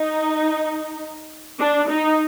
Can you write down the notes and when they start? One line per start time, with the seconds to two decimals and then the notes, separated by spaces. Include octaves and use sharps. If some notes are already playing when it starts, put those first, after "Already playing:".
Already playing: D#4
1.59 D4
1.89 D#4